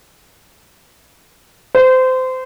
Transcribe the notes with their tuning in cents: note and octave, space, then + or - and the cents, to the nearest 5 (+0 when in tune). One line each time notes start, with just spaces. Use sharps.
C5 -25